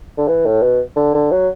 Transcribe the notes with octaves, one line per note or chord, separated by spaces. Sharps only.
D3
E3
A2
B2
D3
D3
F#3